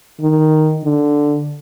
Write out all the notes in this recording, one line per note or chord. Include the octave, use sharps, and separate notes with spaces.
D#3
D3